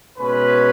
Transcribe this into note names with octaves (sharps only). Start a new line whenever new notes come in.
B2 G#3 C#4 B4